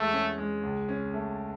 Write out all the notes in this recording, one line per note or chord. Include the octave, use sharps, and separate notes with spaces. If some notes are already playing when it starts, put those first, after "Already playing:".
Already playing: E2 G#3 A3
C#4
G#3
C#2
C#4
A3